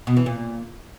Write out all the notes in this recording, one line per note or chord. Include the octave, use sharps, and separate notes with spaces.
B2
E3
A#2